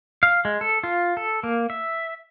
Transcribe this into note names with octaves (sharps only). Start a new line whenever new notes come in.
F5
G#3
A4
F4
A4
A#3
E5